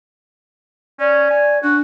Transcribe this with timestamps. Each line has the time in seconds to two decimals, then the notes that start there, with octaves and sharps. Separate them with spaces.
1.00 C#4 D5
1.31 G#5
1.63 D4 F#4